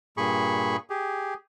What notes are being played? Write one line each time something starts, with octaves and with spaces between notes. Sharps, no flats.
G2 A#2 G#4 B5 C#6
G4 G#4